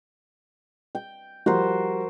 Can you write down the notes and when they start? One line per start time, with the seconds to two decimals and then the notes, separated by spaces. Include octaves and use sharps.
0.95 G5
1.46 F3 G3 F#4 A#4 C5